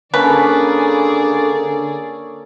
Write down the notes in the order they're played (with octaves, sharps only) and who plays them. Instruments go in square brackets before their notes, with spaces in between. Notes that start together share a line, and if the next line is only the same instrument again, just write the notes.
[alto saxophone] D3 [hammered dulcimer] A#3 C#4 A4 [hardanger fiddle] G#4 D5 [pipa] B4